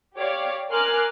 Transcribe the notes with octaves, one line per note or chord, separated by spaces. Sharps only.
G4 C#5 D5 F5 D6
A#4 G#5 C6 D6 F6 F#6